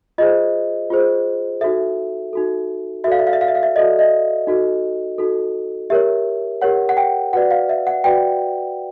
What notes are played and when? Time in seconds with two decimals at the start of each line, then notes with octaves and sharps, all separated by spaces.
0.18 F4 G#4 C5 D#5
0.90 F4 G#4 C5
1.61 D#4 F#4 A4 E5
2.33 D#4 F#4 A4
3.04 F#4 E5
3.07 A4 D5 F5
3.19 E5
3.27 F5
3.33 E5
3.41 F5
3.48 E5
3.55 F5
3.63 E5
3.76 F#4 A4 D5 D#5
3.99 D#5
4.47 D#4 F#4 A4
5.18 D#4 F#4 A4
5.90 G4 A#4 C#5 E5
6.62 G4 A#4 C#5 F#5
6.89 F#5
6.97 G5
7.33 F#4 B4 D5 F#5
7.51 F5
7.69 E5
7.87 F#5
8.04 F#4 B4 D5 G5